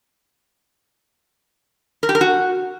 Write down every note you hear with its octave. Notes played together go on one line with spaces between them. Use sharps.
A#4
G4
A#4
F#4